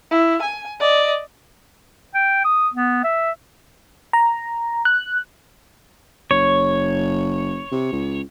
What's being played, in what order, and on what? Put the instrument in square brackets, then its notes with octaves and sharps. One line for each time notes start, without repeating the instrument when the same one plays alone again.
[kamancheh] E4
G#5
D5 D#5
[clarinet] G5
D#6
B3
E5
[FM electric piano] A#5
F#6
[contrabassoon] F#1 [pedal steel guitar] C#5
[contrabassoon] C3
C#2